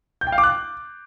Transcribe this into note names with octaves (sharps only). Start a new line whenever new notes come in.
G6
G5
F5
D6
F#6